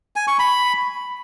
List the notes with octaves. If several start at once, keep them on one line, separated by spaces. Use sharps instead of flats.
G#5
C#6
B5